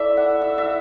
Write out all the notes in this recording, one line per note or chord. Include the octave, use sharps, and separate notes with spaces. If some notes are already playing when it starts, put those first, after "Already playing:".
Already playing: A3 E4 D5 E5
F#5
E5
E5